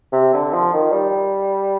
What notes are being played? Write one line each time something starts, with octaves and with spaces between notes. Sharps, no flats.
C3
D3
F3
D#3
G3